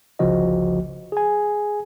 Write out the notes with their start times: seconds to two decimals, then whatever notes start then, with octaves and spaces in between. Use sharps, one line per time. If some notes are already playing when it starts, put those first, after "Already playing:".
0.19 G1 C#2 C#3 F3 F#4 D#5
1.12 G#4 G#5